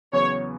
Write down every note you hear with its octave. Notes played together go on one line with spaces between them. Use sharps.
E2 C#3 F#3 B3 C#5